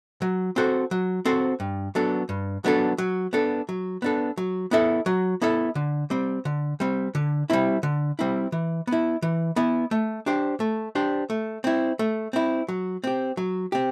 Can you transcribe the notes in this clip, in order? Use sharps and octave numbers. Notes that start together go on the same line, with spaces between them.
F#3
C4 F#4 A4 C5
F#3
C4 F#4 A4 C5
G2
F#3 B3 D4 A4
G2
F#3 B3 D4 A4
F#3
B3 D4 A4
F#3
B3 D4 A4
F#3
B3 E4 A4 E5
F#3
B3 E4 A4 E5
D3
G3 C4
D3
G3 C4
D3
G3 C4 E4
D3
G3 C4 E4
E3
B3 E4
E3
B3 E4
A3
D4 G4 C5
A3
D4 G4 C5
A3
C4 E4
A3
C4 E4
F#3
C4 G4
F#3
C4 G4